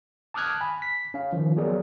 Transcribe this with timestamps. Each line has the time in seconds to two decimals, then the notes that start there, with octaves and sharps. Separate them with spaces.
0.34 A5 D6 D#6 F6 F#6 G#6
0.61 G#5 B5
0.82 B6
1.14 C#4 F5
1.33 D#3 F3
1.57 F#3 B3 G#4 A#4 D5